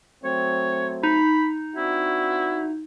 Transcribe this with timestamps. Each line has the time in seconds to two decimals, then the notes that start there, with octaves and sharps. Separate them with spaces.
0.25 F#3 A3 C4 C#5
1.03 D#4 B5
1.76 C4 D4 E4 F#4